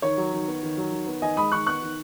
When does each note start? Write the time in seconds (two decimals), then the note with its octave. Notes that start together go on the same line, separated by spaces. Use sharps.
0.02 D#3 C#5
0.17 F#3
0.32 D#3
0.47 B3
0.63 D#3
0.77 F#3
0.92 D#3
1.07 B3
1.22 D#3 D#5 G#5
1.37 G#3 B5 D#6
1.52 D#3 C#6 F#6
1.66 B3 C#6 F#6
1.82 D#3